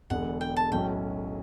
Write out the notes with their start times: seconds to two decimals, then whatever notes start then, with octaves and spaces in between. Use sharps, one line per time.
0.10 E1 E2 D3 F#5
0.41 G5
0.56 A5
0.71 B1 A2 F#3 C#4 G5